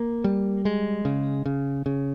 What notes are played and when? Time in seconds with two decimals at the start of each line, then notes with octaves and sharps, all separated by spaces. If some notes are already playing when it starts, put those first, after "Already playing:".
Already playing: A#3
0.24 G3
0.65 G#3
1.05 C#3
1.46 C#3
1.86 C#3